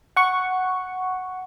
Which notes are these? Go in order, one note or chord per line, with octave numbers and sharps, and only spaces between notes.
F#5 C#6